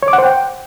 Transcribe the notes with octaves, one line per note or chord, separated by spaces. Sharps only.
C#5
D6
F#5
C5
G5